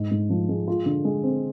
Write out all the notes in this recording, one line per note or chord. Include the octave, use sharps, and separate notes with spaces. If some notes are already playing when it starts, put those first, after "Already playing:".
Already playing: G#2
G#2
F3
G#3
F4
D3
G#3
C4